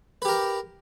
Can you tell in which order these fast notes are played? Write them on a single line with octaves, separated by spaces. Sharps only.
B4 G4 A#4